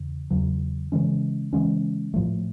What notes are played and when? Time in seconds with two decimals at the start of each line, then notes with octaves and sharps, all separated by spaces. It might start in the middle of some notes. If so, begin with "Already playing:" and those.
Already playing: E2 C#3
0.30 E2 C#3 F#3
0.92 C#3 E3 G#3 C#4
1.53 C#3 E3 G#3 C#4
2.14 A2 F3 A3